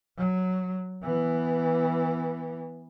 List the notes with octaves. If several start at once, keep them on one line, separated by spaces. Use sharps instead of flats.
F#3
E3 B3